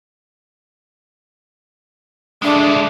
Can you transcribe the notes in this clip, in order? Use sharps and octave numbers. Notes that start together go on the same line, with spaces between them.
G#3 A3 D4